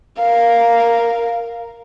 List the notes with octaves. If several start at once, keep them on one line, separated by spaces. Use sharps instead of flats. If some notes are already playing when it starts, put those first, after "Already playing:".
A#4 F5